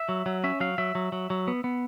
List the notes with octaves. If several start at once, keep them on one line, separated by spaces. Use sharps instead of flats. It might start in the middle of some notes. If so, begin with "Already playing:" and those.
Already playing: E5
F#3
F#3
C#4 E5
F#3 F5
F#3 E5
F#3
F#3
F#3
B3
B3